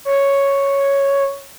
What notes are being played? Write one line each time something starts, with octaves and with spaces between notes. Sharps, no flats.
C#5